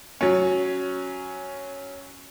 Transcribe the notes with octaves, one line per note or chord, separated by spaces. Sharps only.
F#3 C#4